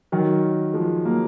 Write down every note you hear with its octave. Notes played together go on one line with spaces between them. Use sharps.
D#3 F#3
F3 G#3
F#3 A#3